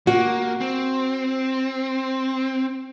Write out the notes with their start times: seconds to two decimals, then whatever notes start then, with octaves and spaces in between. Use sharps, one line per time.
0.07 A#3 F#4
0.60 C4